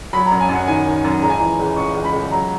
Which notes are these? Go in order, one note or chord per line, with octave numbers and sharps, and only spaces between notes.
F#3 B5
A#5
F#2
G#5
F#2
F#5
D#3 G#5
D#3
F#2
C#2 A#5
G#5
E3 A#5
C#2
C#2 C#6
C#2
B5
C#2
F#3 A#5